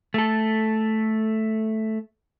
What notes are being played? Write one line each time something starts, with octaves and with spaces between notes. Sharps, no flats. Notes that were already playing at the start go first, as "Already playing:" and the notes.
A3 A4